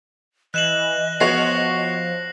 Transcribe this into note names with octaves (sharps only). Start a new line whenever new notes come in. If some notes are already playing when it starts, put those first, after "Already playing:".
E3 D#5 F#6 E7 F#7
F3 B3 F#4 C#5 A#6 C7